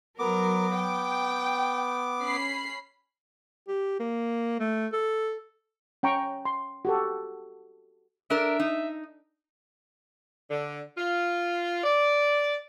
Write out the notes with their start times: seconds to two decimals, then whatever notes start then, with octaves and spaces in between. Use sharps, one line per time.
0.19 F#3 B3 A#4 D6
0.75 G5
2.22 C#4 B5 C7
3.68 G4
4.00 A#3
4.60 A3
4.93 A4
6.03 C#4 G5 A#5 C#6
6.45 C6
6.85 F#4 G4 A4
8.30 D4 A#4 E5
8.60 D#4
10.51 D3
10.98 F4
11.84 D5